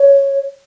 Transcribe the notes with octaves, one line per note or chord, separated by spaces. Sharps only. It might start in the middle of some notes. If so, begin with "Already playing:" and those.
Already playing: C#5